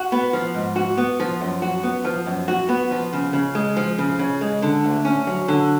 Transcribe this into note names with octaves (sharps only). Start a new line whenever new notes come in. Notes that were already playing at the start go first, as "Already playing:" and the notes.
Already playing: F#4
B3
F3
G#2
F#4
B3
F3
F#2
F#4
B3
F3
F#2
F#4
B3
F3
C#3
C#3
G#3
F3
C#3
C#3
G#3
D3
D2
C#4
F#3
D3